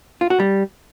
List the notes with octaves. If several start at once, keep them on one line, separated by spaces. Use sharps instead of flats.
F4
F#4
G3